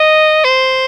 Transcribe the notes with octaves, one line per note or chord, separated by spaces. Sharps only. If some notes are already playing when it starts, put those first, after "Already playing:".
Already playing: D#5
C5